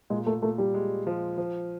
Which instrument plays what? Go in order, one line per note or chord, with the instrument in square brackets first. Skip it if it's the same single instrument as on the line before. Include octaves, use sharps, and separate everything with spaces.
[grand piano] A#2 [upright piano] G#3
[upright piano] A3
[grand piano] A#2 [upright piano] A3
[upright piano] G3
[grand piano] G#3
F3
F3